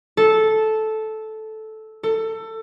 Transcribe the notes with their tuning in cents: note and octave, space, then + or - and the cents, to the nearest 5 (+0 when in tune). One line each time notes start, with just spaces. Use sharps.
A4 -10
A4 +20